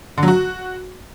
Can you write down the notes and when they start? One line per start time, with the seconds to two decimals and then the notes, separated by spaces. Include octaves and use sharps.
0.18 D3
0.23 F#3
0.28 F#4